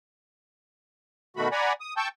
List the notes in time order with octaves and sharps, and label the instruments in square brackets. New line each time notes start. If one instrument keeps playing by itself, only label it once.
[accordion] B2 D#3 A3 F#4 B5
D5 F#5 G#5 A#5 B5
D#6
G5 A5 C#6 E6 G6